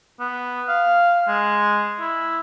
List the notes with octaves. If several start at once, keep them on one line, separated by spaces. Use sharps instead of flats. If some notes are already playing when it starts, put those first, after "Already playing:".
B3
F5
G#3
E4